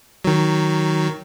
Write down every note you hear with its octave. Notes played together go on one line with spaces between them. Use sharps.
D#3 F#3